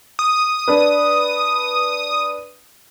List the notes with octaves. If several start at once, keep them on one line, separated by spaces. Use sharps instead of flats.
D#6
D4 B4